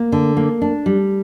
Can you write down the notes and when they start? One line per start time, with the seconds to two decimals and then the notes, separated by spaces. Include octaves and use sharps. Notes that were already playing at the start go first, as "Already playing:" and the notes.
Already playing: A#3
0.12 D3
0.37 A#3
0.62 D4
0.86 G3